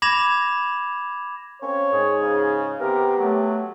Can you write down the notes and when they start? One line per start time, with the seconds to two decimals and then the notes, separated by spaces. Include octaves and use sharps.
0.02 B5 D6 G#6 A#6 E7 F7
1.62 A#3 C4 C#4 C#5
1.92 G#2 G#4
2.22 C#3
2.80 C3 B3 G4 A#4
3.18 F#3 A3